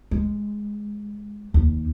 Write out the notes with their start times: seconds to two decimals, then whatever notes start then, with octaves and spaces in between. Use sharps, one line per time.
0.11 G#3
1.54 D#2